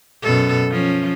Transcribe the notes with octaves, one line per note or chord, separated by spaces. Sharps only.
F#2 B2 A4
F3 C#4